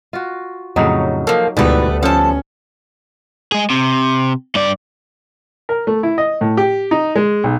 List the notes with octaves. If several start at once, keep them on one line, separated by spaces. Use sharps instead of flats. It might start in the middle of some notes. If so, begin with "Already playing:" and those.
F4 F#4
F2 A2 C#3 F#3 D#4
F3 A#3 A4
D2 G#2 B2 E3 G3 A3 B3 B4
F3 C#4 A4 A5
G#3 G#4
C3
G2 D5
A#4
A3
E4
D#5
A2
G4
D#4
G#3
B1